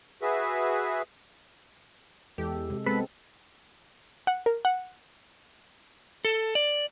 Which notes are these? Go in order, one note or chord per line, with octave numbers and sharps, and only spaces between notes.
F#4 G#4 B4 E5
E2 G#3 G4 A4
C3 G#3
G#3 B3 C4 A4 B4
F#5
A#4
F#5
A4
D5